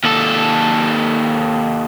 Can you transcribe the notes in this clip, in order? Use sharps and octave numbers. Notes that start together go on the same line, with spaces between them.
D#2 A4